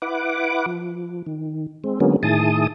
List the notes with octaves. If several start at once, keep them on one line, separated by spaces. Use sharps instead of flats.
E4 B4 F#5 D6
F3
D#3
G#3 C4
D3 F#3 G#3 A#3 B3 C#4
A2 D#3 E4 G#4 A5 D#6